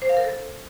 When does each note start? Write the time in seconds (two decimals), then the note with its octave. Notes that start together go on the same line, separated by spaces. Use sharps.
0.02 C5
0.09 F5
0.17 A#4
0.24 A4